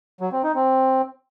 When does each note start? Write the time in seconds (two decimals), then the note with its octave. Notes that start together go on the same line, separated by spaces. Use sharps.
0.21 F#3
0.32 C4
0.44 D#4
0.55 C4